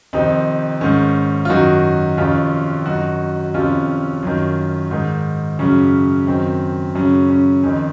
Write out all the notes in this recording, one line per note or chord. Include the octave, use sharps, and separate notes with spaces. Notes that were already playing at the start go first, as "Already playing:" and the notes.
F2 C3 D#3 C4 D#4
G#2 D#3 C#4
F4
F#2 D#3 D#4 F#4
F2 C3 D#3 C#4 F4
F#2 D#3 D#4 F#4
F2 C3 D#3 C#4 F4
F#2 D#3
G#2 D#3
F#2 C#3 C#4
F#2 D#3 C4
F#2 C#3 C#4
C#4
F2 D#3